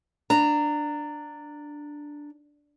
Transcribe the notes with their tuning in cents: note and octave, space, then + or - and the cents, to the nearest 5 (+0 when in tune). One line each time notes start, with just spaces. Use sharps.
D4 +0 A#5 -20